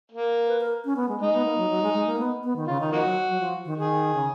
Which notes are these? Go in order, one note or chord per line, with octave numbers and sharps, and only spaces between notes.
A#3
B4
A#4
C#4
B3
G#3
G#3 D#4
B3
A#3
F#3
F#3
G#3
G#3
A#3
B3
B3
D#3
C#3 F4
D#3 D#4
F3 A#3 D#4 F#4
F#3
F#3
F3
D#3
D#3 G#4
C#3